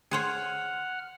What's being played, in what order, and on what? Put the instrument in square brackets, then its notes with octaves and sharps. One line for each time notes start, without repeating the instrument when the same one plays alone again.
[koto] G#4 C5 C#5 [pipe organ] F#5 F6